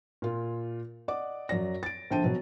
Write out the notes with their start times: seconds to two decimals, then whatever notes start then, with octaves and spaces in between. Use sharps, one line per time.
0.22 A#2 F4
1.08 D5 D#5 F#5 D6
1.49 F#2 F#3 D5 A#6
1.83 A6 D7
2.10 A#1 D3 C5 G5 A5 D#7
2.24 B2 F#3